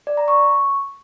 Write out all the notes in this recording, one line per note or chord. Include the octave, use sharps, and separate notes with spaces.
D5
A#5
C#6